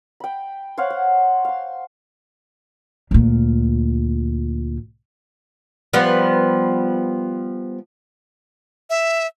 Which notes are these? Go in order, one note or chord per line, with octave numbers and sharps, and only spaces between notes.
G5 B5
C5 C#5 F5 F#5
F#5
F5 C6
D2 A#2
F3 G3 B3
E5